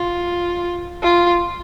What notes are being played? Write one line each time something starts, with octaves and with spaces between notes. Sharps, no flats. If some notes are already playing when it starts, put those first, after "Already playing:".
Already playing: F4
F4